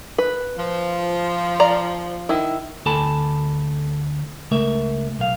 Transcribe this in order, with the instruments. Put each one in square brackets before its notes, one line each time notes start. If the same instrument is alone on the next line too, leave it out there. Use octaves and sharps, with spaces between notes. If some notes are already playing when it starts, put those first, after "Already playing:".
[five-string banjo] B4
[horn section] F3
[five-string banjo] D5 A#5
D#3 E4
[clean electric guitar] D2 A4 G#5 A5 B5
C#2 A3 A#4 E5
B1 F5